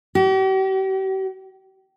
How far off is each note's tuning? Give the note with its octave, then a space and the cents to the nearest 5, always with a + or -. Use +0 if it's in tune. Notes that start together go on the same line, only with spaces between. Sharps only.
G4 -45